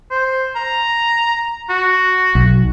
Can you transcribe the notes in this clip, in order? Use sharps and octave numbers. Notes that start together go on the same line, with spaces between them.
C5
A#5
F#4
B1